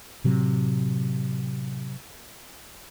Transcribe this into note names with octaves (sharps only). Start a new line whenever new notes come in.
A2 C3 F#3